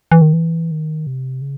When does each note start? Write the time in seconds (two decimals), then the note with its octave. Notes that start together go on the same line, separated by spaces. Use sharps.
0.12 E3
0.22 D#3
0.33 E3
0.71 D#3
1.07 C3
1.42 C#3